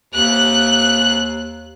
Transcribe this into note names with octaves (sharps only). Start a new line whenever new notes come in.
D#2 F#6